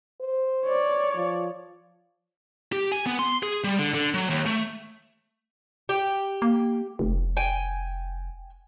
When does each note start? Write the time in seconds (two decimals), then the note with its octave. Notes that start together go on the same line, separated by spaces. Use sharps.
0.21 C5
0.66 C#5 D5
1.15 F3
2.72 G4
2.92 G#5
3.07 B3
3.19 C6
3.43 G#4
3.64 G3
3.79 D3
3.94 D3
4.14 F#3
4.30 D#2
4.46 A3
5.89 G4
6.42 A#3
6.99 F1
7.37 G5 G#5